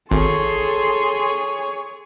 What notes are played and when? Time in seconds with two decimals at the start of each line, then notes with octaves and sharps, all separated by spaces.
0.11 G#1 G#4 A4 C#5 C6